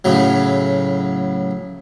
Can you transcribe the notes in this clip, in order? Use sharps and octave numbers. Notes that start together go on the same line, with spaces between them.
A2 C#3 F#3